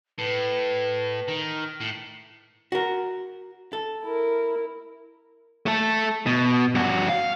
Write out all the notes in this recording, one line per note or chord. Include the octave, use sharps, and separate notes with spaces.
A2 B4
D#3
A2
F#4 A#4
A4
E4 A#4
A3 A4
B2
G2 F#4
F5